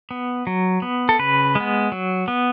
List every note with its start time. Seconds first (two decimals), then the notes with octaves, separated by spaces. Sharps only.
0.11 B3
0.47 F#3
0.82 B3
1.09 A4
1.19 C#3 B4
1.55 G#3 B3
1.92 F#3
2.28 B3